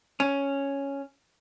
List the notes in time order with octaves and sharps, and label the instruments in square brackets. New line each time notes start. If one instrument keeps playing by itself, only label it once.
[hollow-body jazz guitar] C#4